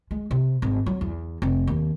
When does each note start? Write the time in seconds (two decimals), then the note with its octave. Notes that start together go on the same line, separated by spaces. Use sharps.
0.11 G#3
0.31 C3
0.62 G#1
0.86 F#3
1.01 E2
1.42 F1
1.67 D#2